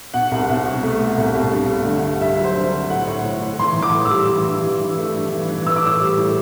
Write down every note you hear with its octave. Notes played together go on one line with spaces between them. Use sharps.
B2 F#5
C2
C2
B2
A3
A3
C2
C2
G2
A3
D3
G2
G2 E5
F#3
C5
D3
D3
A2 F#5
A2
A2
A2
E3 C6
E3
D6
A2
E6
G3
E3
G2
E3
E3
A3
G2
E3
E3
E3 E6
D6
A2 E6
G3
A2